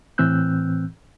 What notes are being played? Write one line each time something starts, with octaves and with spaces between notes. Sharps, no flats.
A2 E3 C4 E6 F#6 G6